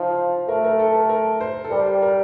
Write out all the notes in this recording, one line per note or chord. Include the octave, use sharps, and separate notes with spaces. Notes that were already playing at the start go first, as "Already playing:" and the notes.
Already playing: F3 D#4 F4
A3 A#4
A#4
A4
A#4
A#4
C5
A4
G3 A#4
A#4